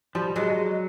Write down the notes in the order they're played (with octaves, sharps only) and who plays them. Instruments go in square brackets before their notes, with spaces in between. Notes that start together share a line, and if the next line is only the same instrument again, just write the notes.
[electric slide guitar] F3 [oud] G3
[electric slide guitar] F#3 [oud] G#3